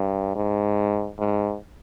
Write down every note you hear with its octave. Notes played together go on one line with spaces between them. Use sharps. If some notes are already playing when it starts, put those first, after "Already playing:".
Already playing: G2
G#2
G#2